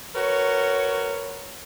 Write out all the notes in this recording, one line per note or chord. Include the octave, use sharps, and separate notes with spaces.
F#4 A#4 B4 C#5